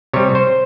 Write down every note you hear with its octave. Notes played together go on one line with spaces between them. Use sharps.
C3 G3 C#5
C5